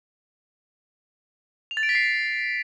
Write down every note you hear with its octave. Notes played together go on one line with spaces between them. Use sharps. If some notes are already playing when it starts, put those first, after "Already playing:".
F7
A6
D7
B6
C7